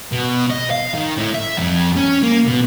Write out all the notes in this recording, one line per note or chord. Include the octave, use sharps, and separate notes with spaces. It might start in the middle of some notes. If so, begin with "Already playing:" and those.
B2
D#5
F5
D#3
A2
E5
F2
C#4
A#3
B2